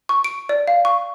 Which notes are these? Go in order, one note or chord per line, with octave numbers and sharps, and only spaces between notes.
C#6
D7
D5
F5
C#6